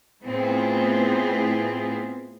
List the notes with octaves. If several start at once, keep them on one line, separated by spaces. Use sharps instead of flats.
A2 B3 C4 E4 F4 G#4